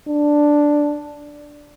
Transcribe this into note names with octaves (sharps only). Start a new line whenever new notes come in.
D4